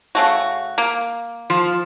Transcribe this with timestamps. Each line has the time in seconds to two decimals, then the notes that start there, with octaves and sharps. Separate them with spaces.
0.15 C#3 A3 F#4
0.78 A#3
1.50 F3